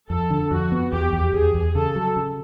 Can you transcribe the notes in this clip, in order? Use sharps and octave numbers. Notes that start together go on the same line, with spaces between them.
F2 A4
D3
F2 F#4
B3
E2 G4
E2
E2 G#4
E2
C#3 A4
F#3
C#3